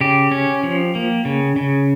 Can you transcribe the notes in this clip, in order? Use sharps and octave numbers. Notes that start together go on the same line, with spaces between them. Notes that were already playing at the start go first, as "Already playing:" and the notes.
C#3 G4
C#4
F3
A#3
C#3
C#3